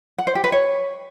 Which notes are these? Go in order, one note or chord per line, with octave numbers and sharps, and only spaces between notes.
F#5
C5
G4
B4
C#5